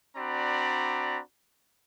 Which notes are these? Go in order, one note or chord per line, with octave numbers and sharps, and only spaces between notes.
C4 D4 F#4 D5 A#5 B5